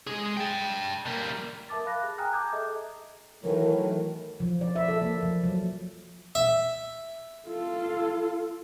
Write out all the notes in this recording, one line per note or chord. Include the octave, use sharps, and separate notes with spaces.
G#3 G#4
G5 A5
G3 A#3
A#4 E5 A5 D6 A6
F5 B5 F#6 A#6
G#4
G5 G#5 A#5 D#6 F6 F#6
A5 A#5 D6 D#6 G6 G#6
G#4 A4 D#5 E5
A2 D#3 E3 F#3 A#4
F3
D5
E5
A4
A#3
F3
F#3
E5
F4 A4